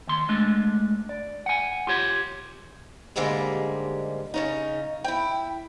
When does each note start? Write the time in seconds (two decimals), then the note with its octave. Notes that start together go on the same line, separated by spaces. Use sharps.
0.07 D#2 C6
0.29 G#3 A3 D4
1.09 D5
1.46 F#5 G#5
1.87 F4 G4 C#5
3.16 D#2 G#2 D3 G3 G#3 A#3
4.34 C#3 C#4 D#4
5.04 E4 G5